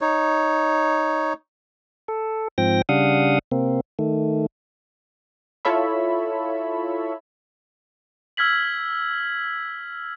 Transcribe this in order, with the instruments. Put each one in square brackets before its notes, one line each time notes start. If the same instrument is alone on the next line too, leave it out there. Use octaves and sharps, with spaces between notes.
[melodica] D#4 C#5
[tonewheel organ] A4
G#2 F3 C4 G5 A#6
C#3 G3 D4 F5 F#5 D#6
C3 A#3 C4
D#3 A3
[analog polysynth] E4 F4 A4 C#5 E5 B5
[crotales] E6 F6 G#6 B6 F#7